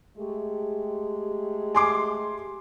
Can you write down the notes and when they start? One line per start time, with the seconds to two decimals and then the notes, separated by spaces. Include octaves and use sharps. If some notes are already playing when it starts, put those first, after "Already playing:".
0.18 G#3 A3 G4
1.75 G#5 C6 D6